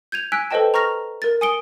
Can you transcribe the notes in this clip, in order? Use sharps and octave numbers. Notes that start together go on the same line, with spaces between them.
G6 G#6 D#7 F7
G#5 E6 F#6 G#6 B6 D7
A4 B4 C5 D#5 G5 A5
A#5 C#6 F6 A#6 F7
A#4 A6
G#5 D#6 C#7 D7 G7